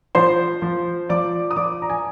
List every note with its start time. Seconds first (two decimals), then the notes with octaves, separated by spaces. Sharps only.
0.15 F3 C5 C6
0.62 F3
1.09 F3 D5 D6
1.51 D#6
1.56 F3 D5 D6
1.82 A#5
1.90 G#5